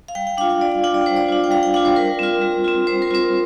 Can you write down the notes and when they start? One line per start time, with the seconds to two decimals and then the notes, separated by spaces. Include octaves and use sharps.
0.08 F5
0.15 G3 G5
0.27 G5
0.38 D4 F5
0.41 F4
0.50 F5
0.61 G3 D5
0.72 F5
0.84 D4 F4 G5
0.94 D5
1.06 G3 C5
1.16 D5
1.29 D4 F4
1.44 G5
1.51 G3 F5
1.63 G5
1.74 D4 F4 F5
1.85 C5
1.96 G3 A#4
2.19 C4 F4
2.42 G3
2.64 C4 F4
2.87 G3 C5
3.02 A#4
3.11 C4 F4 C5